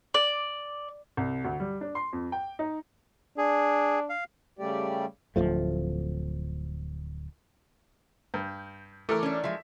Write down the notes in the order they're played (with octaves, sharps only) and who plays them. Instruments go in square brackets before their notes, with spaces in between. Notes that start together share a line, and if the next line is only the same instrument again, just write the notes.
[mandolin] D5
[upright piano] C2
D2
G3
D4
C6
F2
G5
D#4
[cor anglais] D4 [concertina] G#4
[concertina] F5
[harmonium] C#3 G3 A3 G4 D5
[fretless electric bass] D1 B1 F3 A3
[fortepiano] G2 [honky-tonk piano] G6
[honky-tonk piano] E3 A4 D6 [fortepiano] A3 A#4
[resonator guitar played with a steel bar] C#4 D4
[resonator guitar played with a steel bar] F3 G#3 [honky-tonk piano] E5